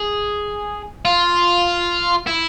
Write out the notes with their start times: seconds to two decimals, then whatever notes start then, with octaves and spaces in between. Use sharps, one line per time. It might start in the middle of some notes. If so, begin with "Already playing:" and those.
Already playing: G#4
1.05 F4
2.27 E4